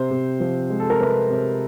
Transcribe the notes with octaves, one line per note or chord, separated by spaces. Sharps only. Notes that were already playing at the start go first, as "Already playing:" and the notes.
Already playing: C3 C5
C3
F3
G#3
A4
A#4
C3 B4
C3